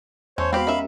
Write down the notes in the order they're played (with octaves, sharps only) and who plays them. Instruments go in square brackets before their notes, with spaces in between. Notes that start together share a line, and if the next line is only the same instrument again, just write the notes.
[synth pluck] E2 [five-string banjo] A3 C#4 [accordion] C5 C#5
[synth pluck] G#3 B3 F#4 [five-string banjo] C4 G4 [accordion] F5 B5
[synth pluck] C#4 G4 A#4 [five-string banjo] D#4 E5